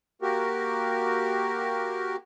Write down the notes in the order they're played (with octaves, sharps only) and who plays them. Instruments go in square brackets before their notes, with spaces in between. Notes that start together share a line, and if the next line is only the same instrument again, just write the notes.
[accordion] A#3 F#4 G4 A#4